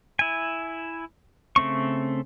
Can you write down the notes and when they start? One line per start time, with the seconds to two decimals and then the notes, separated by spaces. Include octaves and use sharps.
0.19 E4 G#5
1.56 C#3 A3 C4 C#6